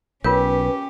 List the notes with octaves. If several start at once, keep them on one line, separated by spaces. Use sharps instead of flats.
B1 C#4 F4 G4 A#4 B4 C#5